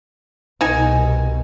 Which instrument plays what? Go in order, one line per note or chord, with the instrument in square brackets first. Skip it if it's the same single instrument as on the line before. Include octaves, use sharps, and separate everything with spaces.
[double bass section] C2 B2 [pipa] D#3 D#4 G#5